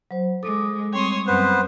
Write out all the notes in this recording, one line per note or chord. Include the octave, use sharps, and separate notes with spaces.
F#3 C5
G#3 A4 D6 D#6
G3 C4 C#5 C6 D#6
F#2 B3 B4 C5